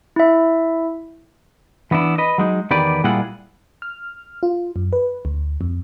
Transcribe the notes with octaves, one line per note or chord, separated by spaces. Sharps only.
E4 E5
E3 B3 D4 E4
B4 D#5
F#3 G#3 D#4
E2 D#3 B3 G4 B4 D5
A#2 G3 E4 F4 G#4 F#5
F6
F4
F#2
B4
D2
F2